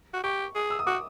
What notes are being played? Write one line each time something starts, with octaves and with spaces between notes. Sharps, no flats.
F#4
G4 C#6
G#4
E6
D#6
F#4 D6